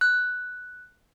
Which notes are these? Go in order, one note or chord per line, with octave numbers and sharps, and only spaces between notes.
F#6